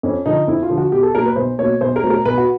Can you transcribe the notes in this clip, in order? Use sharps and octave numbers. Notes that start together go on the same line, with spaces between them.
F2 C#4
D3 F3 D#4
F2 E4
F4
D3 F3
F#4
B1 G4
A4
B2 F#3 A#3 A#4
B4
B1 C5
B2 F#3 A#3 C#5
B1 C5
A#4
B2 F#3 A3 C4
A#4
B1 B4
F#4